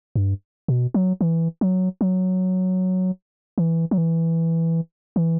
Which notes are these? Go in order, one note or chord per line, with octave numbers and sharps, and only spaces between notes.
G2
B2
F#3
E3
F#3
F#3
E3
F#3
E3
E3